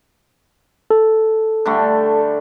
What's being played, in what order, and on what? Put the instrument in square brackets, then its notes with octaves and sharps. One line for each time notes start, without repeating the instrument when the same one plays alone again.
[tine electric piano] A4
[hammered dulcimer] D3 G3 A3